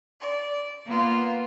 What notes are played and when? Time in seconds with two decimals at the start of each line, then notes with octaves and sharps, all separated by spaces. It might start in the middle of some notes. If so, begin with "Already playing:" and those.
0.19 D5
0.86 A#3 B3 F4